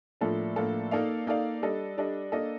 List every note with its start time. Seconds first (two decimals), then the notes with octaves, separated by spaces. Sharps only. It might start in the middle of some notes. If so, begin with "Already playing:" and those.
0.21 A2 F3 A#3 D4 A4
0.56 A2 F3 A#3 D4 A4
0.91 A#3 D#4 A4 D5 F5
1.27 A#3 D#4 A4 D5 F5
1.62 G3 D4 A4 D#5
1.97 G3 D4 A4 D#5
2.32 A#3 D4 A4 D#5